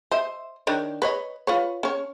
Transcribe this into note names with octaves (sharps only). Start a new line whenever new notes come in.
C5 D#5 E5
D#3 D4 C#5
B4 C#5 D#5
F4 B4 C#5
C#4 C#5